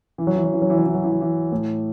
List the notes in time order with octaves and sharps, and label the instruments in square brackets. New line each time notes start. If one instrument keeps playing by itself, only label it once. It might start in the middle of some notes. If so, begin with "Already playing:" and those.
[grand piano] E3
F#3
E3
F#3
E3
F#3
E3
F#3
E3
F#3
E3
F#3
E3
A2